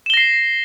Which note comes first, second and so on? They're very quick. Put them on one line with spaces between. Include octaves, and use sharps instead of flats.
E7 G7 A#6 C7